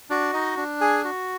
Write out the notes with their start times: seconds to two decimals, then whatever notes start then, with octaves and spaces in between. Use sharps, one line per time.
0.10 D4 F#4 D5
0.34 D#4 D#5
0.57 D4
0.81 G#4 G#5
1.04 F#4